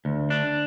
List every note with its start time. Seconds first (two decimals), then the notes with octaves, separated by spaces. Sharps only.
0.05 D2
0.30 D4